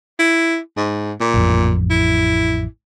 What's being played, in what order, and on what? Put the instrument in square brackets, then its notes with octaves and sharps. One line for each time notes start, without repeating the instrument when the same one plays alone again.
[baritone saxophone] E4
G#2
A#2
[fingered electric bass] A1 F2
[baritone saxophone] E4